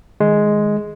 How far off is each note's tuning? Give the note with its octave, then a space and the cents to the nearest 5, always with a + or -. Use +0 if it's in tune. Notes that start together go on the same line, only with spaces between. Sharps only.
D#3 +0 G#3 +5